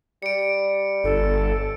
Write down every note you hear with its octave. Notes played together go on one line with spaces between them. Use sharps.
G3 C#7 D7
G1 A4